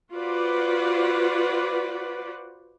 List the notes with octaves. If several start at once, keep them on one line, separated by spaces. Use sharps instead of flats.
F4 F#4 B4 C5 D5 F#5